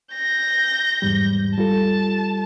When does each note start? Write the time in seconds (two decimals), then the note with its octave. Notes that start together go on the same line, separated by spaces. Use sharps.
0.14 G6 A#6
1.02 E2 G#2 G3
1.58 G3 F4 A4 A5